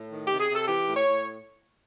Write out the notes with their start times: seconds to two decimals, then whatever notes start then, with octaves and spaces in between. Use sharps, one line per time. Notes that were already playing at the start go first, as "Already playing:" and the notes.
Already playing: A2
0.12 D#3
0.26 C3 G4
0.40 G#4
0.49 C3 A4
0.67 E3 G4
0.86 A2
0.95 C#5
1.05 A2